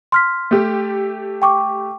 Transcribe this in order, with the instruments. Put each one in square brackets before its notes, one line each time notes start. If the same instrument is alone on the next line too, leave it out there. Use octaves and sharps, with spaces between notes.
[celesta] C6 F6 B6
[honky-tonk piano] A3 G4
[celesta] G5 C#6 D6